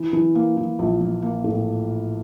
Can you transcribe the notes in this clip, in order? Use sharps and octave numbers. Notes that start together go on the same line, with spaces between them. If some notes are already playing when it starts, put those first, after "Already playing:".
Already playing: E3
E3
A#3
E3
A#1
A#1
A#3
A2